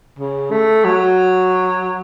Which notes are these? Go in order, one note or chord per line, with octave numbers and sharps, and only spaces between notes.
C#3
A3
F#3